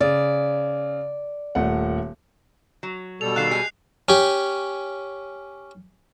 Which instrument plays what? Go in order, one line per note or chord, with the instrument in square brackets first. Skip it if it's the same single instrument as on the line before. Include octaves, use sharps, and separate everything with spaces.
[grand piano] C#3 [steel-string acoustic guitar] D5
[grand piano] D#1 A3 F#5
[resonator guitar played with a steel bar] F#3
[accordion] B2 G3 A4 [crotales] F7
[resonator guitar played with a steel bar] D#3 F5 A5 [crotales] F#6 C7
[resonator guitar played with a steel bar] G#3 G4 G#5 [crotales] C7
[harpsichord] C#4 G4